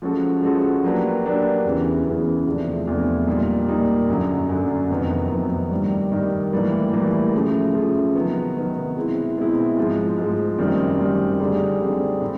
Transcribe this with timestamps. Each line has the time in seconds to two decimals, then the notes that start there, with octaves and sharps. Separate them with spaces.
0.02 F3 G#3 C#4 F#4 A4
0.42 F3 G#3 C#4 F#4 A4
0.84 F#3 A#3 D4 G4 B4
1.24 F#3 A#3 D4 G4 B4
1.65 E2 C#3 E3
2.05 E2 C#3 E3
2.46 E2 C3 F3 A3 D4
2.87 E2 C3 F3 A3 D4
3.27 A#2 G3 A#3 D#4
3.68 A#2 G3 A#3 D#4
4.09 F#2 D3 F#3
4.49 F#2 D3 F#3
4.90 F2 C3 D#3 F#3 B3
5.30 F2 C3 D#3 F#3 B3
5.71 G2 D#3 G3
6.12 G2 D#3 G3
6.53 A2 E3 G3 A#3
6.93 A2 E3 G3 A#3
7.34 C#3 F3 A3
7.74 C#3 F3 A3
8.15 C3 D#3 F#3 B3
8.56 C3 D#3 F#3 B3
8.97 B2 G#3 C4 E4
9.38 B2 G#3 C4 E4
9.77 G#2 F3 G#3
10.18 G#2 F3 G#3
10.58 F#2 D#3 G3 C4
11.00 F#2 D#3 G3 C4
11.40 D3 G3 C4 D#4 G#4
11.81 D3 G3 C4 D#4 G#4
12.21 A2